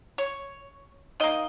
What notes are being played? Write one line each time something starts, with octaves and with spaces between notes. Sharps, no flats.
C#5
D#3 A#3 D#5